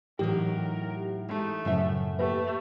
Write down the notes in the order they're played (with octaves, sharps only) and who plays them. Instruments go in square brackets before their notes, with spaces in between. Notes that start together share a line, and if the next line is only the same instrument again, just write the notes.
[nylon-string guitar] A2 F#3 [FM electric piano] E3 G4 [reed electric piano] D#4 [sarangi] A#4
[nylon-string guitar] G#3 D#4 [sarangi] A3
[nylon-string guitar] F#2 A2 E5 [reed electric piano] C#3 F3 F#3
[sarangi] A3 [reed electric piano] A#3 G4 [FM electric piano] B4